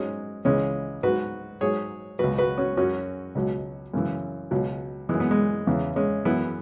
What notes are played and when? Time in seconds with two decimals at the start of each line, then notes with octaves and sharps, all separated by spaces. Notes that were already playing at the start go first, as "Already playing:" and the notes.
Already playing: G#2 F#3 G#3 C#4
0.45 C#2 C#3 E3 G#3 C#4
1.03 G#2 F#3 F#4 B4
1.61 G#2 F#3 G#4 C#5
2.19 C#2 B2 F#3 F#4 B4
2.38 F#4 B4
2.58 C#4 F#4
2.77 F#2 F#3 C#4 F#4
3.35 C#2 B2 F#3
3.94 F#2 C#3 E3
4.51 C#2 B2 F#3
5.09 F#2 E3 G#3
5.20 B3
5.31 G#3
5.67 E2 C#3 E3
5.96 G#3 C#4
6.25 F#2 E3 B3 E4